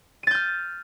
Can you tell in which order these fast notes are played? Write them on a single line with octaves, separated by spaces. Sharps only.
D#7 A6 G6 F6